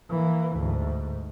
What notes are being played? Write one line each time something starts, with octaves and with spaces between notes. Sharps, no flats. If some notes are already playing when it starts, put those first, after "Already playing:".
E3 A#3
D2 G#2